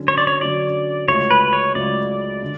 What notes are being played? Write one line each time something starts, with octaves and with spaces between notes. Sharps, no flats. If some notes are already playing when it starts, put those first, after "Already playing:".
Already playing: D3 F#3 C#4 F#4
C#5
D5
C#5
D3 F#3 C#4 F#4 D5
C#2 C#3 F#3 A3 C#5
B4
C#5
C#2 C#3 F#3 A3 D5
D3